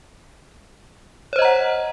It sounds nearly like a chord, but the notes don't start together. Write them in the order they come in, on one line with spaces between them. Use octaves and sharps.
C#5 C5 D#5 A#5 F#5